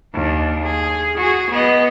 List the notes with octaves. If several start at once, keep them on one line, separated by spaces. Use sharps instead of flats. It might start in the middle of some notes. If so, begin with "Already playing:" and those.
D#2 D4
G#4
F#4 G#4
B3 D#5